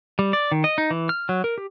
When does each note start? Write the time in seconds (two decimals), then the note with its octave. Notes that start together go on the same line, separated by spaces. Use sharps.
0.19 G3
0.33 D5
0.52 D#3
0.64 D#5
0.78 D#4
0.90 E3
1.09 F6
1.29 F#3
1.44 A#4
1.58 G4